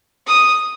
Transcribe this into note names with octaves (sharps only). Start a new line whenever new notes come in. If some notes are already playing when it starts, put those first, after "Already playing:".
D#6